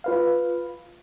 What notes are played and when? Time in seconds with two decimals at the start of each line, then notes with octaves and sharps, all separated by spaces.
0.04 F4 B4 F5